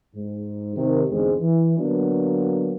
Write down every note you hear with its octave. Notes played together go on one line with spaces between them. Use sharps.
G#2
C3 D#3
E2 G#2 D3 G#3 C4
E3
D3 F#3 A#3 B3 D4